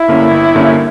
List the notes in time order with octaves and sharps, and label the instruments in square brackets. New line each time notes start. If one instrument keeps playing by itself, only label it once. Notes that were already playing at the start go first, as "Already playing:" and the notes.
Already playing: [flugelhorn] E4
[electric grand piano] G2 D3 A#3 C#4
G1
G2 D3 A#3 C#4